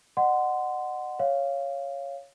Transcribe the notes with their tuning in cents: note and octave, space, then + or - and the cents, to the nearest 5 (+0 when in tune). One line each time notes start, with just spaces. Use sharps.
D#5 -40 F#5 +0 C6 -20
C#5 +0 F5 -5